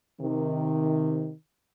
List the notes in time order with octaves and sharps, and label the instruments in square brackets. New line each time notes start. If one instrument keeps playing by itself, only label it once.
[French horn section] C3 D#3